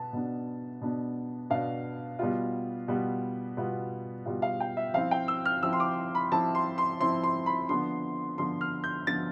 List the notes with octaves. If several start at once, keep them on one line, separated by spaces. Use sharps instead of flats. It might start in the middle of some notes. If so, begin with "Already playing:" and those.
Already playing: B2 B3 A5
B2 B3 D4
B2 B3 D4
B2 B3 D4 F5
B2 G3 B3 F4
B2 G3 B3 F4
B2 G3 B3 F4
B2 G3 B3 F4
F5
G5
E5
F3 C4 E4 F5
G5
E6
F6
F3 C4 E4 E6
C6
D6
B5
F3 C4 E4 A5
C6
C6
F3 C4 E4 C6
C6
B5
D3 F3 B3 C6
D3 F3 B3 C6
F6
G6
D3 F3 B3 A6